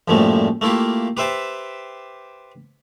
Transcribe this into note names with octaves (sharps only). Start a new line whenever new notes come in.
A#1 F#2 A2 F3 G3 A3
A3 A#3 E4 F4 G4
G4 B4 C5 E5 G5 A5